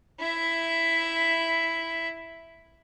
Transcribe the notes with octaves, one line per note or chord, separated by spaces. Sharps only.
E4 E5